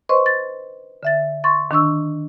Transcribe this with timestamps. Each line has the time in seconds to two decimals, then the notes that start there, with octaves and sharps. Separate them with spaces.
0.09 B4 C5 D#5 C6 C#6
0.26 A6
1.03 D3 E5 A6
1.44 C6 C#6 A6
1.71 D#3 D4 C#6 E6